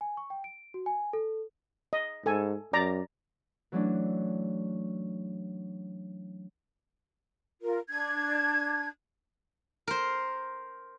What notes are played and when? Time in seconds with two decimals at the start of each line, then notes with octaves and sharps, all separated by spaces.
0.01 G#5
0.17 C#6
0.30 G5
0.44 D7
0.74 F#4
0.86 G#5
1.13 A4
1.93 D#5
2.26 G#2 A4 G#5
2.73 F#2 D5 A#5
3.72 E3 F#3 A3 C#4 D4 E4
7.62 F4 A#4
7.89 D4 G#6
9.88 A#4 C5